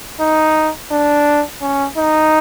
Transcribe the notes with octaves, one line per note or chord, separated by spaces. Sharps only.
D#4
D4
C#4
D#4